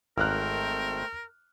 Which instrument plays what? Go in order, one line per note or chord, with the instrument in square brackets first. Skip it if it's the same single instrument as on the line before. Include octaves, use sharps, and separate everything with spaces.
[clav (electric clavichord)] G#1 A#5 [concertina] A3 C5 G5 [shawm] A#4 [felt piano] F6 F#6